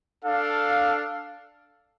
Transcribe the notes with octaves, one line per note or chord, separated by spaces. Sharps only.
D4 A4 F5